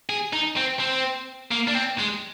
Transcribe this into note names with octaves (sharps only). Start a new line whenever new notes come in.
G#4
D#4
C4
C4
A#3
D4
C4
G#3